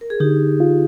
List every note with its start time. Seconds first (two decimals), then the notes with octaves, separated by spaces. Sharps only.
0.01 A#4
0.10 G#4
0.20 D3 D#4 G4
0.60 F4